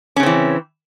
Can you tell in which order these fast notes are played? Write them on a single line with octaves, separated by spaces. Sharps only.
C#4 C#3 C4 E3